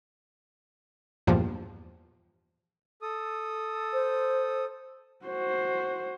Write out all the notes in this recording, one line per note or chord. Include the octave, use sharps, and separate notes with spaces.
E2 G2 A#2 F3
A4 D#6
C5
F#4 C5